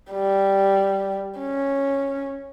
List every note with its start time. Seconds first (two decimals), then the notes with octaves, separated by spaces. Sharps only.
0.12 G3
1.39 C#4